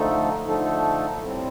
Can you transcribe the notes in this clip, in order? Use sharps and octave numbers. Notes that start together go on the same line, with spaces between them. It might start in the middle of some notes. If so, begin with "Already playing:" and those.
Already playing: D3 F3 A3 D#4 A4
D3 F3 A3 D#4 A4
A2 G3 C4